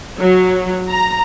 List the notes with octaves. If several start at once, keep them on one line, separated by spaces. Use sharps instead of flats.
F#3
A#5